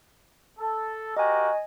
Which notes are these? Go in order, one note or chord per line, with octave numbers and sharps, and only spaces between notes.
A4
F#4 G4 A#4 D#5 G#5